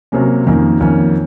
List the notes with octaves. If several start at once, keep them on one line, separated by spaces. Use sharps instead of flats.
C3 F#3 A#3 C#4
F2 D#3 A#3 C#4
F2 D#3 A#3 C#4